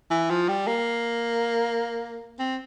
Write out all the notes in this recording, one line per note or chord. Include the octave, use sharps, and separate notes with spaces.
E3
F3
G3
A#3
C4